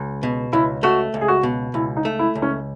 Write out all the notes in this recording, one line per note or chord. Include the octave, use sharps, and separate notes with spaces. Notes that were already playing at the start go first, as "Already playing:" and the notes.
Already playing: C#2
B2
C#2 E4
A3 F#4
C#2
G#4
F#4
B2
C#2 E4
D#4
A3
E4
C#2
C#4